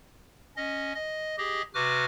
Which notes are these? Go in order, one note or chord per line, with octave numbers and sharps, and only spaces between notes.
C#4 D#5
D#5
G4 G#4 D#5
C3 F#4 B4 D6 F6